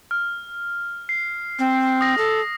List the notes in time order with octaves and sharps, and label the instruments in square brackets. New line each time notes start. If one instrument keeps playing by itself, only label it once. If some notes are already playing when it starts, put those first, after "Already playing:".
[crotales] F6
C7
[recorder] C4
[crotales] D#6 A#6
[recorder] A4